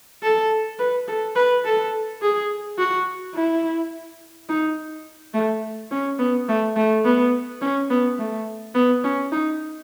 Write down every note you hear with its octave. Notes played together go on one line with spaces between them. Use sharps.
A4
B4
A4
B4
A4
G#4
F#4
E4
D#4
A3
C#4
B3
A3
A3
B3
C#4
B3
A3
B3
C#4
D#4